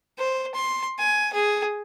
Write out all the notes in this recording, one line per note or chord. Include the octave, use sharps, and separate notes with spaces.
C5
C6
G#5
G#4